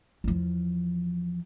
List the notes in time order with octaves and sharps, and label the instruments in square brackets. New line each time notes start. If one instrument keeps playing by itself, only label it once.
[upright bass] E2 F3